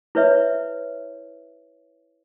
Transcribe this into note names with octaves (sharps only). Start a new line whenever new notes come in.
E4 B4 C#5 E5